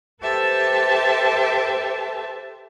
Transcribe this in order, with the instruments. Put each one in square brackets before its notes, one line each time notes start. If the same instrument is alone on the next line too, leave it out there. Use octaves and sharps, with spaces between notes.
[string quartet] G4 A4 B4 C5 E5 A5